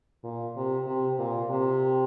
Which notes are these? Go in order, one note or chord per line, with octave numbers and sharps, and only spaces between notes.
A#2
C3
C3
A#2
C3